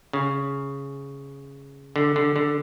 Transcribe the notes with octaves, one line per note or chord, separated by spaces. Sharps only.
C#3
D3
D3
D3